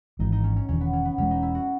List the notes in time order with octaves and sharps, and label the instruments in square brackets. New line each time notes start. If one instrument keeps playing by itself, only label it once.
[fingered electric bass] G#1 G#2 E3 [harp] D#4
[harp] D#4
C#4
C#4
[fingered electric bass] E1 E2 D#3 [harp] C#4
[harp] B3
C#4
B3
[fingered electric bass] E1 E2 D#3 G#3 [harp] C#4
[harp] D#4
E4
F#4